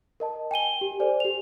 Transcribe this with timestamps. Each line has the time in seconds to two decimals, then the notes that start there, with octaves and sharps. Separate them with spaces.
0.20 A#4 D#5 A5
0.51 G5 G#5 D#7 G7
0.81 G4
1.00 A4 C5 D5 G#5
1.20 G4 F7